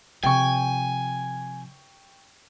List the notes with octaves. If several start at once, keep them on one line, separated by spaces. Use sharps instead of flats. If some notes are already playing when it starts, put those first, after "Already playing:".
C3 F3 G5 G#5 C#6